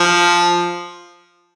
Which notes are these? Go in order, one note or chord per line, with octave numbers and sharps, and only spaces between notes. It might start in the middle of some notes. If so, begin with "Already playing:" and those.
Already playing: F3